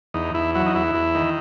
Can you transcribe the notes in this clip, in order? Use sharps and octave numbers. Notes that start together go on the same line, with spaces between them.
E2 D#4
E2 E4
F#3 E4
D#4
E2 E4
E2
D#3